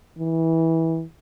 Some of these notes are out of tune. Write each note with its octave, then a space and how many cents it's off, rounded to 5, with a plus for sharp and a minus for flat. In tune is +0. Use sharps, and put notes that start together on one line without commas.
E3 -20